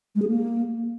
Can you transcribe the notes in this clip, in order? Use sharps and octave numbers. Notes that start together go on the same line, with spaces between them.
G#3
G#4
A#3